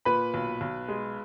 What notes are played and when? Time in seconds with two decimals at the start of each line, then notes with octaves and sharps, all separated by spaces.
0.05 A#2 B4 B5
0.34 B1
0.61 B1
0.88 G#3